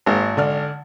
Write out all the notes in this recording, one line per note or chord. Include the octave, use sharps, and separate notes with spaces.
G#1 G#2 A#3
D3 D5 F6